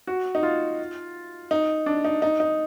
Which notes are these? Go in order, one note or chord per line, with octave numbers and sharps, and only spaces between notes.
F#4
D#4
F4
D#4
D4
D#4
D#4
D#4